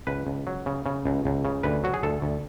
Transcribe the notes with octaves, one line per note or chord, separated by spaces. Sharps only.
C#2 B4
C#2
F#3
C#3
C#3
C#2
C#2
C#3
D2 B4
F#3 F#4
G#4
D2 A4
D2